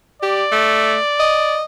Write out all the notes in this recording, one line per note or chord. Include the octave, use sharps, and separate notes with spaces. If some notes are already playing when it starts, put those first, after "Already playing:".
G4 D5
A3
D#5